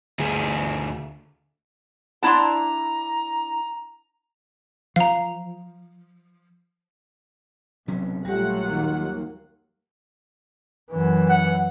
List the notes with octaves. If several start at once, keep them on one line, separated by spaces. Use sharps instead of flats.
D2 G#4
D4 E4 F#5 A5 A#5 C6
F3 F5 A#5
B1 C3 F#3 C#4
A#1 F#3 G3 A3 F4 G4 F#5
D#2 D#3 A#3
F#2 E3
F#5